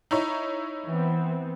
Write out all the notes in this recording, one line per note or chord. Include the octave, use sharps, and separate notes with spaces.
D#4 E4 C#5
E3 B3 C4